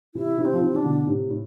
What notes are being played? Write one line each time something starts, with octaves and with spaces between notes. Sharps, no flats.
C3 E3 E4
C3 E3
C4
F3
C3 E3
E3 D4
B2 D3
A2 C3
A2